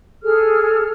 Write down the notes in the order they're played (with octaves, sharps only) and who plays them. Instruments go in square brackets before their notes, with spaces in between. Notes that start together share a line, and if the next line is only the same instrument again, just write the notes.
[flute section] G#4 A4 F6